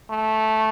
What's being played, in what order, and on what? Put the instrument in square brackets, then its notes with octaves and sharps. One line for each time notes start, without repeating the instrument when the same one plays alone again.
[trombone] A3